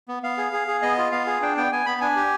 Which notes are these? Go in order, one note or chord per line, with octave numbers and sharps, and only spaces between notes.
B3
B3 F5
G#4
G#4
G#4
B3 D#5
F4
B3 F5
G#4
D4 G5
B3 G5
B3 G#5
B3 B5
D4 G#5
G4